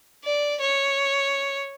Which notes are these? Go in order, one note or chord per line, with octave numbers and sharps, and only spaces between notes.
D5
C#5